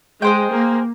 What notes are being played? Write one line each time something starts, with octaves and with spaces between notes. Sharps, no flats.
G#3 G#4 C5 G5
A#3